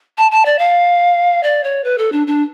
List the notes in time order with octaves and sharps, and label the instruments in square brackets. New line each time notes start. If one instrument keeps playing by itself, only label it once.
[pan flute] A5
A5
D5
F5
D5
C#5
B4
A4
D4
D4